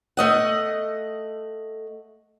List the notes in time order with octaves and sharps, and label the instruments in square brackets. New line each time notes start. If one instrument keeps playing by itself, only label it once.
[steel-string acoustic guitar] A3 D#5 F#5